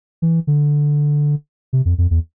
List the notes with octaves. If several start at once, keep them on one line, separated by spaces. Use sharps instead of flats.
E3
D3
C3
F2
F2
E2